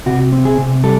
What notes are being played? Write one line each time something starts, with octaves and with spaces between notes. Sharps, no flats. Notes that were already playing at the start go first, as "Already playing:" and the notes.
C3 F#4
C4
G#4
C3
G3 A4